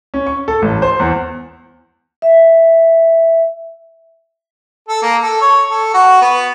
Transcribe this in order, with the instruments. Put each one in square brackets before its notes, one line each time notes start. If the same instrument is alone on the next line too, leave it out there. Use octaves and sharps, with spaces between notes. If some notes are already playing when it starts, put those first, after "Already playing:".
[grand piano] C#4
C#6
A4
A1
C5
E2
[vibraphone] E5
[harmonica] A4
A#3
A4
C#5
A4
F#4
B3